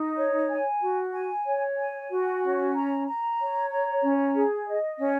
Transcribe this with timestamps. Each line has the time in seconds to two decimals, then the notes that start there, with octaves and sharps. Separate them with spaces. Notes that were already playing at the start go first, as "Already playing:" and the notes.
Already playing: D#4
0.17 C#5
0.50 G#5
0.81 F#4
1.13 G#5
1.46 C#5
1.78 G#5
2.10 F#4
2.42 C#4
2.74 A#5
3.06 A#5
3.39 C#5
3.71 A#5
4.02 C#4
4.35 G#4
4.67 D#5
4.99 C#4